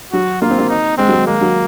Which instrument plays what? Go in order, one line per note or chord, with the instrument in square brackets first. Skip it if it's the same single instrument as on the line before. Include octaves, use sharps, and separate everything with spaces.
[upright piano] F#3 [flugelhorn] F#4
[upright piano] A#3 [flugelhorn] F4
[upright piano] C4
A#3
[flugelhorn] D#4
[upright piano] G#3 [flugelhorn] C4
[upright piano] F#3
G#3
[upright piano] G#3 [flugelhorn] A#3
[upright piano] F#3